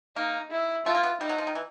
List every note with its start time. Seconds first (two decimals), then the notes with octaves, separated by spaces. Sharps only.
0.16 A#3 D#4
0.51 E4
0.86 A3 F4
0.95 A#3
1.03 B3
1.21 G3 D#4
1.29 F#3
1.38 F3
1.47 D#3
1.55 E3